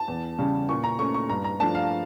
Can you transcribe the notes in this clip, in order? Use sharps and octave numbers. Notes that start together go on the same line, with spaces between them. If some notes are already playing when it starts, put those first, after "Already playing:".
Already playing: A5
E2
C#3 G3 C#4
A#2 C#6
A#5
A3 C#4 C#6
C#6
G2 A#5
A#5
F3 A3 D4 A5
F5